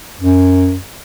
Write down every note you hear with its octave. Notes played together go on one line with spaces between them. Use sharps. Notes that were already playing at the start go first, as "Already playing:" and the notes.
F#2